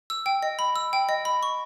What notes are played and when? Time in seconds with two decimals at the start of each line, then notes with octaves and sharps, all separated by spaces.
0.10 E6
0.26 G5
0.43 D#5
0.59 B5
0.76 E6
0.93 G5
1.09 D#5
1.25 B5
1.43 C#6